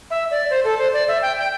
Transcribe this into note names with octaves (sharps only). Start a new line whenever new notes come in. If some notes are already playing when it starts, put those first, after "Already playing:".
E5
D5
C5
A4
C5
D5
E5
G5
G5